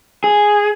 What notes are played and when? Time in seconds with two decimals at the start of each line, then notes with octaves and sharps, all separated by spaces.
0.24 G#4